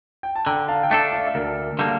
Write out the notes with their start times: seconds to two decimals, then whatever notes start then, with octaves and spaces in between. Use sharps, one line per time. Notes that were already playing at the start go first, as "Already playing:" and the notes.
0.23 G5
0.36 A5
0.46 D3 G5 A#5
0.68 F5 A5
0.83 G5
0.90 A3 D4 A4 F5 A5
1.13 D5 F5
1.26 E5
1.35 D2 A#4 D5
1.79 D3 G3 A#3 A4